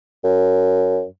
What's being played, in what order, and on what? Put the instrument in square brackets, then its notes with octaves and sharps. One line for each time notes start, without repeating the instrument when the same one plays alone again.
[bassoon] F#2